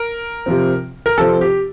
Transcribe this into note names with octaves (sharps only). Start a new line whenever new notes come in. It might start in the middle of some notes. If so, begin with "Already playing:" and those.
Already playing: A#4
C3 F3 C4
A#4
C3 F3 C4 A4
G4